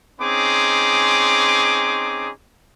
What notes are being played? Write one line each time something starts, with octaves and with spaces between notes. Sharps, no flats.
C4 C#4 D#4 G#4 C6 D6